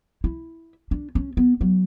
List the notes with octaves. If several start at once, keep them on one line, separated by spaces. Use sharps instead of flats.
E4
D4
C#4
B3
F#3